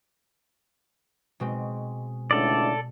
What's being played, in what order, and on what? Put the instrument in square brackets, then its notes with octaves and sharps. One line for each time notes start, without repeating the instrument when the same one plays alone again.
[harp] B2 G#3 C4
[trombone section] C#2 A2 D3 [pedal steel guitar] A4 D5